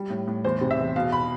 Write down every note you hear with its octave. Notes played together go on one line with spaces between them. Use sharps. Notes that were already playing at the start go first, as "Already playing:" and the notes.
Already playing: G3
A2
A2
E2 C5
C3
E5
E2
B2 F5
B5